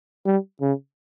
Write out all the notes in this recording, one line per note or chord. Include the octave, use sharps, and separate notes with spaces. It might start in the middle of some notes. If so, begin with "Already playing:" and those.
G3
C#3